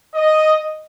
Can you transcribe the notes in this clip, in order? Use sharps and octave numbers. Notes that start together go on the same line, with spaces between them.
D#5